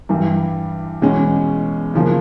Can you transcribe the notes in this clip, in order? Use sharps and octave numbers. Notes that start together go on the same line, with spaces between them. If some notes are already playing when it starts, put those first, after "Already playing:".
G2 E3 G3
E2 B2 G#3 C#4
F#2 C#3 F3 A#3